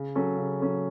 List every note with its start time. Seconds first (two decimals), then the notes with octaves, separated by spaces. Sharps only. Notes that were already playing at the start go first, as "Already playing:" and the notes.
Already playing: C#3
0.15 F#3 C#4 A4
0.37 C#3
0.60 F#3 C#4 A4